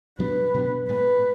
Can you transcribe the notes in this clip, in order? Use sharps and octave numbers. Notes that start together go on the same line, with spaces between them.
B2 F#3 B3 D4 B4
B2 F#3 B3 D4
A2 G#3 B3 B4